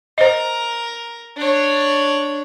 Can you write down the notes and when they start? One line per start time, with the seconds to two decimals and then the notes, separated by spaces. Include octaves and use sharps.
0.18 A#4 C5 D#5
1.36 D4 C#5